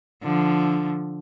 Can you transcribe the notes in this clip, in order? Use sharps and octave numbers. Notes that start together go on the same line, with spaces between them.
D3 F3